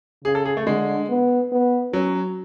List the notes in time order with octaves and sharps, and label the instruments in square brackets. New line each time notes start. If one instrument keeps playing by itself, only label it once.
[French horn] C#3 [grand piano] G#4
[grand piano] A4
G#4
A3
[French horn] D3 [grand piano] G#3
[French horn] B3
B3
[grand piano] F#3 [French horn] C#4